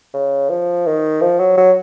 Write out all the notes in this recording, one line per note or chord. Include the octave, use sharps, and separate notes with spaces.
C#3
F3
D#3
F3
F#3
F#3